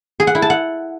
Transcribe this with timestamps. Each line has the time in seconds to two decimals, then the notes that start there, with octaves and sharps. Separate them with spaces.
0.20 G#4
0.27 F#5
0.35 E4
0.42 A5
0.50 F#5